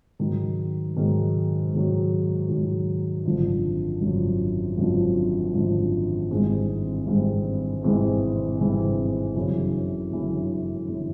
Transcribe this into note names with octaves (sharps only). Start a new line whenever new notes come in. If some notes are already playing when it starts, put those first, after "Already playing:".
G#2 D#3 F#3
G#2 D#3 F#3
G#2 D#3 F#3
G#2 D#3 F#3
G#1 F#2 D3 F3
G#1 F#2 D3 F3
G#1 F#2 D3 F3
G#1 F#2 D3 F3
G#1 G2 E3 G#3 C4
G#1 G2 E3 G#3 C4
G#1 G2 E3 G#3 C4
G#1 G2 E3 G#3 C4
G1 F#2 C#3 E3
G1 F#2 C#3 E3
C#3 E3